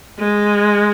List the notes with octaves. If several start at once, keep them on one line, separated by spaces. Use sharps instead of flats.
G#3